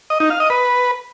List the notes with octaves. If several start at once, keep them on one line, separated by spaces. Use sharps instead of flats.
D#5
D#4
F5
D#5
B4